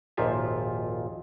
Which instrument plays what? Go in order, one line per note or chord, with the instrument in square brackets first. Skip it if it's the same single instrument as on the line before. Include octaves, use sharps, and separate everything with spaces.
[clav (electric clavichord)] G#1 D#2 A#2 F3 F4 E5